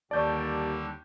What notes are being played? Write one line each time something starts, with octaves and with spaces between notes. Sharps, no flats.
D#2 D3 G3 D5 A5 C#6 G6